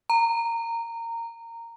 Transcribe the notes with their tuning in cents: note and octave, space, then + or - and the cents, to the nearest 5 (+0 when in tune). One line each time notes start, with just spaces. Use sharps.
A#5 -15